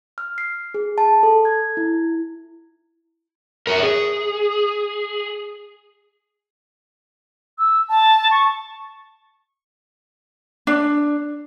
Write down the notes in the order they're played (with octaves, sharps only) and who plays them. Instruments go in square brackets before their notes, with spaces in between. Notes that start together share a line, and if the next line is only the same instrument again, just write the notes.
[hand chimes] F6
C7
G#4
A5
A4
G#6
E4
[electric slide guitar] A#4 C#5 E5
G#4
[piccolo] E6
A5
C#6
[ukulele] D4